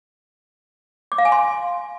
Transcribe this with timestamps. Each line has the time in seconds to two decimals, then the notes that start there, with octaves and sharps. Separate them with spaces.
1.12 D6
1.18 F5
1.25 G#5
1.32 C6